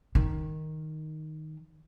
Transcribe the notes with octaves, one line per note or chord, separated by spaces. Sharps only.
D#3